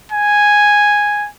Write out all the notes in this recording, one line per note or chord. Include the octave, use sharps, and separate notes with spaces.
G#5